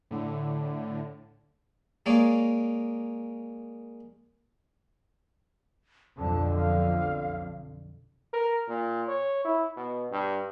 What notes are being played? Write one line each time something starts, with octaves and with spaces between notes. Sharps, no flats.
A2 D3
G#3 A#3 C#5 D5
B1 F2 D3 A5
F5
A#4
A#2
C#5
E4
B2
G2